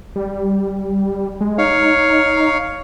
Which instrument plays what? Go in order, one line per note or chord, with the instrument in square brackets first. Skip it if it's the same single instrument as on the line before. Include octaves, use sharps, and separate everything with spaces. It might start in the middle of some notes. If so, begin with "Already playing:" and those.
[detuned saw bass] G3
G#3
[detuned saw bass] D#4 [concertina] C#5 F5